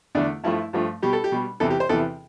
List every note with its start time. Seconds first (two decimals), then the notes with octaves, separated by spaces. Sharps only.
0.15 E2 D3 A3 D4
0.44 G2 F3 A3 E4
0.73 G2 F3 A3
1.02 B2 G3 G4
1.13 A4
1.24 G4
1.32 B2 G3
1.60 E2 C3 E3 A4
1.70 G4
1.80 C5
1.89 E2 C3 E3 A4